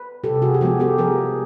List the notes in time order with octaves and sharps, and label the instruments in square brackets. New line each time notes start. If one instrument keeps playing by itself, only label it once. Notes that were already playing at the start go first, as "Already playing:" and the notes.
Already playing: [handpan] B4
C3 G4 A4
F#4 G#4
G4
F3 G#3 B3 F#4 G#4
G4 A4
F3 G#4 A#4